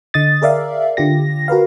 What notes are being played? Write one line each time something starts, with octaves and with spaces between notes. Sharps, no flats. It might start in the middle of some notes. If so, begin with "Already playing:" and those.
D3 D#5 D#6 A6
G#4 A#4 D5 E5 F5
D3 F4 G4 A#6
F#4 A#4 B4 F5